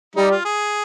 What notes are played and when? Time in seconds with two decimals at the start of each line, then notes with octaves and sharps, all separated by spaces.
0.16 G3 D#4
0.31 F4
0.45 G#4